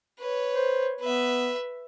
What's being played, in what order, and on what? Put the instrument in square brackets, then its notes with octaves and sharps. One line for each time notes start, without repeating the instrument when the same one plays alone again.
[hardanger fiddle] B4 C#5
[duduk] C5
[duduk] B3 [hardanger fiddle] B4 E5